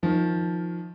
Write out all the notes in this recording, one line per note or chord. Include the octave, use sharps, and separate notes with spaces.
D#3 F3